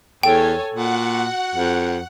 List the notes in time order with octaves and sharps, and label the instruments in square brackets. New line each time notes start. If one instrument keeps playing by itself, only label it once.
[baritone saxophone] E2 [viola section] A4 C#5 G#5 [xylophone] G5
[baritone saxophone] A#2 [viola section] F#4 [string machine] F#5
[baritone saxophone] F2